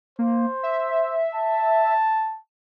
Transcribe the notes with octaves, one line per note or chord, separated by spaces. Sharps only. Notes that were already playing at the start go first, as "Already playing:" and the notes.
A#3 C5
E5
A5